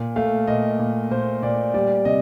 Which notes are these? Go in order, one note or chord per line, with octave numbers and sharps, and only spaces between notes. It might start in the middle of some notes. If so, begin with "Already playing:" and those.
Already playing: A#2
A3 F5
A#2 D#5
A#2
A#2 C5
A#2 D5
G3 D5
C3 D#5